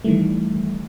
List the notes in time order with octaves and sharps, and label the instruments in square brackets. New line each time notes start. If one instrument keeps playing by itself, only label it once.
[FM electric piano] D#3 E3 G3 A3